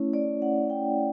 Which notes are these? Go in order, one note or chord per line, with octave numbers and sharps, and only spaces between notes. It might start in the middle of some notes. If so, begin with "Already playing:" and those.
Already playing: A3 C#4 E4 C#5
D5
F#5
G5